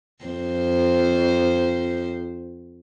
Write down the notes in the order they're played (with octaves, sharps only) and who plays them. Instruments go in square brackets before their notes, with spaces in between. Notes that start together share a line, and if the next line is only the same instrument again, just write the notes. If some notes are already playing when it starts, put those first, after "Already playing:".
[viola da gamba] F2 C5